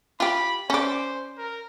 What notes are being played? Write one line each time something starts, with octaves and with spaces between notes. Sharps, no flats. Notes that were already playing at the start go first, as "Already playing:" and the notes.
F4 G4 B5
C#4 C5 D5
A#4